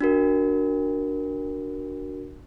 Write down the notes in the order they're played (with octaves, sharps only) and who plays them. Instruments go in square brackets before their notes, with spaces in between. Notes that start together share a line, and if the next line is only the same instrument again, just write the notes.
[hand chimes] D4 F#4 A#4